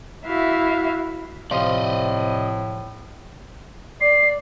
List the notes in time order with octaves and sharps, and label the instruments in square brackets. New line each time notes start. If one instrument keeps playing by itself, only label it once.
[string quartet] E4 F#4 E5 F5
[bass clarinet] A2 [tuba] C3 [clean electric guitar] F3 F5 C6 [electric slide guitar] D5 D#5
[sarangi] D5 [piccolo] C7